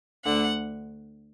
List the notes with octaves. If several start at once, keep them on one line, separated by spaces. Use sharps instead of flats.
D2 D3 F#5